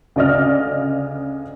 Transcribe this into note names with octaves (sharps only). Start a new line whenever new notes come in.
D2 C#3 D5 D#5 F6